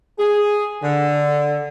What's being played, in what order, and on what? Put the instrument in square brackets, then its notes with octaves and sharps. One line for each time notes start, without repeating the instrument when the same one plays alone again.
[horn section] G#4
D3